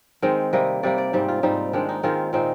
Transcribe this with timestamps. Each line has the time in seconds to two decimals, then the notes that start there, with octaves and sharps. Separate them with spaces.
0.22 D#3 G#3 C4 D#5
0.53 C3 G3 A#3 D#5
0.83 C3 G3 A#3 D5
0.98 D5
1.13 G#2 G3 C4
1.28 F4
1.43 G#2 G3 C4 D#4
1.73 D#3 G#3 C4 D4
1.89 D#4
2.03 D#3 G#3 C4 F4
2.33 A#2 G#3 C4 D#4